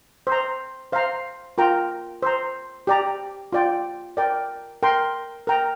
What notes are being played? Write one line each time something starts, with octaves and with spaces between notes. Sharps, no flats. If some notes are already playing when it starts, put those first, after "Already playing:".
C5 A#5
C5 F5 A#5
F4 A#4 G5 A#5
C5 A#5
G4 D5 A#5
F4 D5 G5
A#4 D5 G5
A#4 G5 C6
A#4 G5 A#5